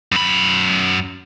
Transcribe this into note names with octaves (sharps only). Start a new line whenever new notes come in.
F#2 B5